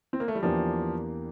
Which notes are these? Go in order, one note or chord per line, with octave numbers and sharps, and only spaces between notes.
C4
A#3
A3
G3
E2 E3 F3 A#3 D4 G4